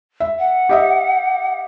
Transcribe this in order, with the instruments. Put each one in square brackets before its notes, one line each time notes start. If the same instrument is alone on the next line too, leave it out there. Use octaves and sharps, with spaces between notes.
[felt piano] E5
[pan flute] F#5
[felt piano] G4 D#5 E5